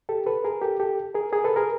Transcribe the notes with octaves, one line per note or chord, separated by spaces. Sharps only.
G4 A4
A4 B4
G#4 A#4
G4 A4
G4 A4
G#4 A#4
G#4 A#4
A4 B4
G#4 A#4